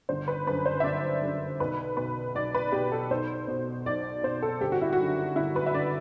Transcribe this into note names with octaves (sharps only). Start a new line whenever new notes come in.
G1 C5
B4
F#2 D3 B4
C5
E5
G1 D5
F#2 D3
B1 B4
B2 B4
B1 D5
B4
B2 G4
A4
B1 C5
B2
B1 D5
B2 C5
A4
G1 G4
F#4
E4
F#4
F#2 D3
G1 E4
B4
E5
D3 D5